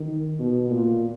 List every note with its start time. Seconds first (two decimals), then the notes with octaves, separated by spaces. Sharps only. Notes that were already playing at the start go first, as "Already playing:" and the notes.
Already playing: D#3
0.39 B2
0.70 A#2